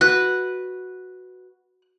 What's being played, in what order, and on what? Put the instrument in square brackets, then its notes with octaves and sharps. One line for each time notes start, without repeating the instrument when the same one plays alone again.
[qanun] F#4 B4 [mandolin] F#6